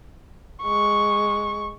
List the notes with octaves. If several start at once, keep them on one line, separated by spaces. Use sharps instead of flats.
G#3 C#6